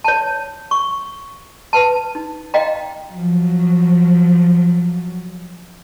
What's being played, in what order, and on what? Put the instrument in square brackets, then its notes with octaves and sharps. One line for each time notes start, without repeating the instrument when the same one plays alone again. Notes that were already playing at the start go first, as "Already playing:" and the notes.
[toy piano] C#5 A5
C#6
B4 A5
D#4
D#5 F5 G5 A#5
[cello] F3 F#3